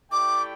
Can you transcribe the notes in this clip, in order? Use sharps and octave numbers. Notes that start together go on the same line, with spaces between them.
A3 E4 G4 D5 G5 D6